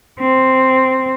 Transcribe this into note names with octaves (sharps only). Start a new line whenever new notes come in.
C4